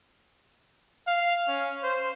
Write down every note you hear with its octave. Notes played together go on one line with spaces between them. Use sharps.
F5
C#4
C5